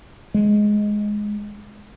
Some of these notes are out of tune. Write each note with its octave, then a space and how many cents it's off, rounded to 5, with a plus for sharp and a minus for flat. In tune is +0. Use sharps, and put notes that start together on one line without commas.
G#3 +5